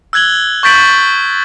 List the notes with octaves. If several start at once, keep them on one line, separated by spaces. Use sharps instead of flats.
E6 F#6 G#6 F#7 G7
C#6 G6 A6 B6 D7 F#7